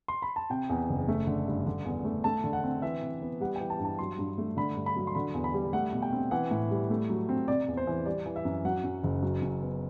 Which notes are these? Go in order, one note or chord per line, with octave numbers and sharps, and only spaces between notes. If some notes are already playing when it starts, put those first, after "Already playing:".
C6
B5
A5
C3 G5
E2
F#1
A3
D3
G2
D3
E2
A3
A3 A5
D3
F#5
C4
E3 E5
C3
B3
G3 F#5
G5
E3
A5
G2
A5
F#3 C6
G2
A3
D3 B5
G2
B5
F#3
C6
D3 B5
E2
B5
G3
A3 F#5
B2
G5
C4
E3 F#5
A2
G3
A3
F#3
C4
C3 D5
E2
C5
E3
G3 D5
E3
E5
F#2
F#3 F#5
F#2
F#1
F#3
F#2
B3